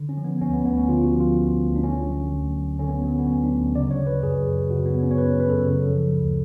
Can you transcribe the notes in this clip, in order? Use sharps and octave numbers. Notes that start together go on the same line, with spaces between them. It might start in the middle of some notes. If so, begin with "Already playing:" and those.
Already playing: D3
C#4
F3
B3
D2 C#4
B3
D2 B3
C#4
D3 F4
F#4
F3
F4
D2
D2
D4
D3 C#4
F#3
D2
D2
D3 C#4
B3
F#3 B3
B3
D2 C#4
D4
D2
C#3 D5
C#5
F#3
B4
F#2 G#4
F#2
C#3 F#4
B3
F#3
C#4
C#5
F#2 B4
F#2 B4
A4
C#3
F3
D2